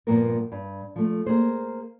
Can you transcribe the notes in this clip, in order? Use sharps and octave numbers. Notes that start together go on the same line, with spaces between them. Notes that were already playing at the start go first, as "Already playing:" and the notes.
G2 A#2 F3 A#3 B3 A#4
G2
F3 A3
A#3 G#4 C5